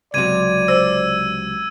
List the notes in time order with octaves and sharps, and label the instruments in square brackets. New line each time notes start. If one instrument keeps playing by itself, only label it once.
[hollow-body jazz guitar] C#2 C3 F#3 [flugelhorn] D5 [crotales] G#6 D#7
[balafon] C5 [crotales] E6